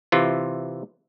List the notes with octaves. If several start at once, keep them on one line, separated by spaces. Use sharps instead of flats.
C3 E3 F4